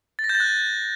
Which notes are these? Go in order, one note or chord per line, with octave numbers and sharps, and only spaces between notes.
A6
A#6
G6
A6
F#6